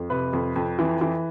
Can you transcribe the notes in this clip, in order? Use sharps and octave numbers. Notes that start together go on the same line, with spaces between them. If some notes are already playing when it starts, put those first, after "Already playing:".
Already playing: F2
C3 B4
F2
F2
E3
E3